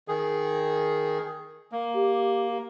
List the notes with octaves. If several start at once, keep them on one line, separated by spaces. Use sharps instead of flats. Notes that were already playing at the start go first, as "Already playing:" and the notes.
D#3 G#4
A#3
G4